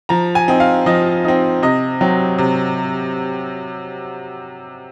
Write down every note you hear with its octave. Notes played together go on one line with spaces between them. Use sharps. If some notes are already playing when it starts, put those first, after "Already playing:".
F3 A#5
G#5
C4 D#4
F5
F3 D#5
C4 D#4
C3 D#5
F#3 C4
C3